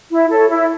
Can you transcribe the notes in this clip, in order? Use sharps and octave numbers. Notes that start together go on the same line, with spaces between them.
E4
A4 C#5
E4